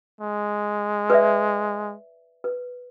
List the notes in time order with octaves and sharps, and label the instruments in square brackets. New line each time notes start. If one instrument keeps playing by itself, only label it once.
[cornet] G#3
[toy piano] B4 D5 E5
B4